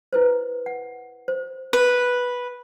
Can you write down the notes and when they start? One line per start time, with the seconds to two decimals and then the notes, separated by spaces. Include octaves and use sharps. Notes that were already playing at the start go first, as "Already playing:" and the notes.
0.13 E4 B4 C5
0.66 F#5
1.28 C5
1.73 B4